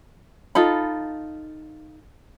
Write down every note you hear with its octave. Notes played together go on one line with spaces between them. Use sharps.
D#4 F4 A4 B5